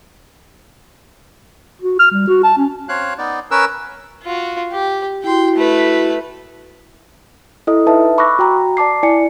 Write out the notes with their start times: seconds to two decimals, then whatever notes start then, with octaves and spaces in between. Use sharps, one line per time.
1.82 F#4
1.99 F6
2.11 G3
2.27 F#4
2.43 A5
2.58 C#4
2.89 C4 C#5 F5 F#6
3.18 B3 D#4 D5
3.51 C#4 A#4 B4 E6
4.23 F4 F#4
4.72 G4
5.24 E4 F#4 G5 C6
5.56 A3 B4
7.67 E4 A4 D#5 D#6
7.86 D#4 B4 E5 A5
8.18 B5 C#6 D6 E6 F#6 A#6
8.39 F#4 G5 A#5
8.77 D5 A5 D6 C7
9.03 E4 D5 G#5 C#7